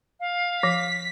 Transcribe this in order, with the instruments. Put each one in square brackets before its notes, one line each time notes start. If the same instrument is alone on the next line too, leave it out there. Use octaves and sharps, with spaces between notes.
[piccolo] F5
[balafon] F3 [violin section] B6